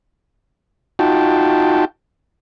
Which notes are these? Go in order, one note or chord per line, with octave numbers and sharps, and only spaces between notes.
D#4 F4 F#4 G5 A5